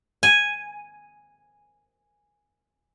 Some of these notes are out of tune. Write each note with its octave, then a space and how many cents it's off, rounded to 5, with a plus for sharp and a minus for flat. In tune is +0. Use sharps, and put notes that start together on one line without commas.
G#5 -5